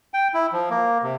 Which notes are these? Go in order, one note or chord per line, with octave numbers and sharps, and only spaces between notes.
G5
E4
F3
A#3
C3